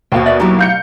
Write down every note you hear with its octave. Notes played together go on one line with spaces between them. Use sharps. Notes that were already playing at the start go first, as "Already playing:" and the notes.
D#2 B2 C5 F5 G5
B4 D5 E5
F#3 D#4 E4 G4
F5 G6 C#7